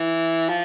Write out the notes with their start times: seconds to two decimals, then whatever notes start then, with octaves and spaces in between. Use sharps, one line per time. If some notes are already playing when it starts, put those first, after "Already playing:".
Already playing: E3
0.49 F3